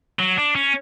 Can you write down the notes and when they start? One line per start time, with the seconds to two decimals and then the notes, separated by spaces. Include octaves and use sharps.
0.19 F#3
0.38 D4
0.55 C#4